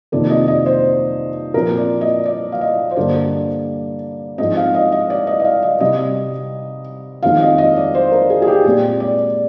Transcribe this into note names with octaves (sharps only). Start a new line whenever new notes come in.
F2 C3 D#3 A#3 D5
D#5
D#5
C5
A#2 F3 C4 A#4
D5
D#5
D5
F5
D#5
C5
G2 D3 G3 A#3 D5
G#2 F3 C4 D#5
F5
D#5
D#5
D5
D#5
D#5
F5
D#5
C3 G3 C4 D#5
F2 D#3 G#3 C4 F5
D#5
D#5
D5
C5
A#4
G#4
G#4
G4
A#2 G#3 C4 D5
D5